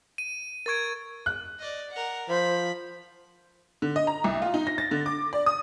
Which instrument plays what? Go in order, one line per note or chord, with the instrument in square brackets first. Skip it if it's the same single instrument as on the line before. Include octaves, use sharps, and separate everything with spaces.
[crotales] D#7
[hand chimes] A#4 C#6 D7 [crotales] G#6 A6
[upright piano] F#6
[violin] D5 D#5
A#4 F#5
[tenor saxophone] F3 [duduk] C5 [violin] B5
[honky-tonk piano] D3
D#5
A#5
C2
F4
D#4
A#6
A6
D3
D6
D5
D#6